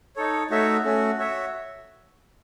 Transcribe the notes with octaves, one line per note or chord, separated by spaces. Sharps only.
D#4 A4 C#5
A3 D#4 F#4 C#5 E5
A3 C#4 F#4
F#4 C#5 E5